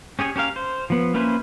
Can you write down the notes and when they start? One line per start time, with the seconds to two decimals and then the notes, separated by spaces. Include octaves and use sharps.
0.19 C#4 G4 G#4 C#5
0.36 C#4 G4 A#4 F5
0.56 C5
0.90 F3 B3
1.14 A#3 C#4 E4 B4 C5